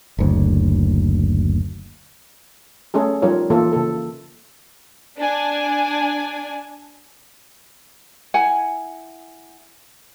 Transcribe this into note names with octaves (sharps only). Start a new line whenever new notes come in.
F#1 D2
A3 C#4 G#4 A4
F3 G3 D#4 F4 A#4 C#5
E3 A#3 F4 A4
C#3 A#3 A4
D4 G#5
E4 F#5 G#5